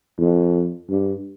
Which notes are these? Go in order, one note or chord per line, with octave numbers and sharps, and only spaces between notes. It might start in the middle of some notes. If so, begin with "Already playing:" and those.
F2
G2